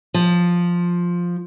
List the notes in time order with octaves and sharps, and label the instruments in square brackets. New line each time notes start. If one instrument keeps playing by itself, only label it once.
[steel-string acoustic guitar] F3